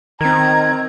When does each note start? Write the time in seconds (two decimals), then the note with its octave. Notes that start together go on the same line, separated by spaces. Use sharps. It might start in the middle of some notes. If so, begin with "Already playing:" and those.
0.21 D#3 C4 A#4 A#5 G#6